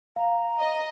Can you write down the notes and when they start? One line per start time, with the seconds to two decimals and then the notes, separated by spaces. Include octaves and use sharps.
0.16 F5 A#5
0.59 D#5